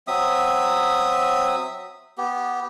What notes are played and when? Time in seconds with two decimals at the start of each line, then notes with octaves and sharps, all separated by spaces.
0.08 F#3 C4 E5 D#6
2.18 B3 G4